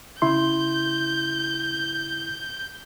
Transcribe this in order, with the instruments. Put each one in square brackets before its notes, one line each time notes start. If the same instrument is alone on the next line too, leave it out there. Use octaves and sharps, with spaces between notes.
[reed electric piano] C#3 E4 C6 [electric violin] G6